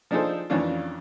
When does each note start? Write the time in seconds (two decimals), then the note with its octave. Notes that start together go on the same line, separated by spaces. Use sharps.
0.11 F3 D4 D#4 G#4 A4 C5
0.50 F2 D#3 E3 C#4 D4 F4